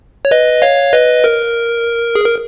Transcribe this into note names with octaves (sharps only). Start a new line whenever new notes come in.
C#5
B4 D#5
C#5 F5
B4 D#5
A#4
G#4
A#4